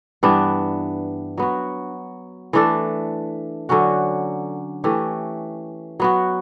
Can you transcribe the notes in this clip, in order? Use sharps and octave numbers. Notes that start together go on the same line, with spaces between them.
G2 E3 B3 D4
F#3 B3 F#4
E3 A3 D4 A4
D3 F#3 C#4 F#4
E3 A3 C#4 G4
F#3 B3 F#4